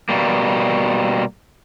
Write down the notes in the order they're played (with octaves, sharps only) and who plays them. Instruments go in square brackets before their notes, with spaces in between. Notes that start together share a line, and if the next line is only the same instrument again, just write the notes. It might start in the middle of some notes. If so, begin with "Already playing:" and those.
[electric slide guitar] B2 G3 A#3